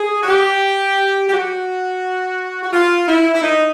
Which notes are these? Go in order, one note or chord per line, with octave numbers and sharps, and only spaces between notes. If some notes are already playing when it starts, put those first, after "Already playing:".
Already playing: G#4
F#4
G4
G4
F#4
F#4
F4
E4
E4
D#4